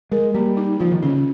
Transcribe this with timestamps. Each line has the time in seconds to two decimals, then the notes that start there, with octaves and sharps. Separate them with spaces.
0.12 G#3 A#4
0.34 G3 A#3
0.57 D#4
0.80 F3 F4
0.92 D#3
1.03 C#3 C#4